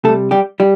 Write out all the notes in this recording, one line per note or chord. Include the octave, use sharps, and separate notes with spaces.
C3 G3 A3 A4
G3 G4
G3 G4